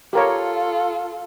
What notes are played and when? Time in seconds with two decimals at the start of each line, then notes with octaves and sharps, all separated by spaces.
0.13 F4 G4 A4 A#4 C#5